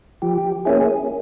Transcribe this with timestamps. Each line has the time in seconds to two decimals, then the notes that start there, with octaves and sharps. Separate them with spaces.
0.22 F3 G4
0.65 A#3 C#4 E4 G#4